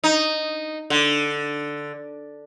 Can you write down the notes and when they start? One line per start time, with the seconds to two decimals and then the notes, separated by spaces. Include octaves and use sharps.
0.04 D#4
0.90 D3